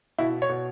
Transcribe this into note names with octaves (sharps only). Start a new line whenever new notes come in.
B2 E4
C#5
B2